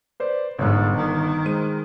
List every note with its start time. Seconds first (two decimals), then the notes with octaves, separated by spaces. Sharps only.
0.20 B4 C5 D5
0.59 G1 G#2 C#5 F#6
0.96 D#3
1.45 G#3 C5 D#7